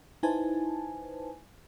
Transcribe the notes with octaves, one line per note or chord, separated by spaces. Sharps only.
D#4 E4 B4 C5 G#5 A5